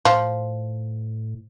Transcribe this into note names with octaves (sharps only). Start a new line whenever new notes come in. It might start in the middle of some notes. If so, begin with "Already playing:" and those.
A2 F3